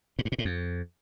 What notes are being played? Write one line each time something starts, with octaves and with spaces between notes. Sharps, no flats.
G#2
G2
A#2
A2
F2